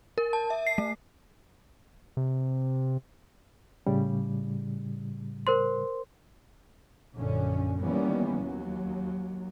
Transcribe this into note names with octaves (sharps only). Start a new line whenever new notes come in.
A#4
A5
E5
C7
A3
C3
A2 C#3 G3
A#4 C5 C6
A#1 F#2 A#2 D3 C#4
D#3 E3 G3 A#3 B3 C#4
D#2 F#3